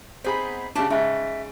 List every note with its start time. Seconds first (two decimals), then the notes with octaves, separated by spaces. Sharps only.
0.24 B3 C4 D#4 G#4 B5
0.75 C#3 A3 D4 G4 A5
0.90 G#2 C#3 E5